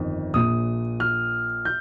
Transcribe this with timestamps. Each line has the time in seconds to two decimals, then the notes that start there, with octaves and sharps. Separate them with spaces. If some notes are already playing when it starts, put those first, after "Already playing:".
Already playing: G1 F2 D#3
0.34 A#1 A#2 D#6
1.00 F6
1.65 G6